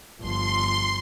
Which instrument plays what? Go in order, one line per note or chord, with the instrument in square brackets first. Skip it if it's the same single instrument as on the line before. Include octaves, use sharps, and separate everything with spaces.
[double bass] G1 F3 [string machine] C6